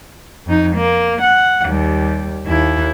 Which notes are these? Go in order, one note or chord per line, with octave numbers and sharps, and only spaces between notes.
F2 D#4
A#3
F#5
D#2 G3
D#2 E4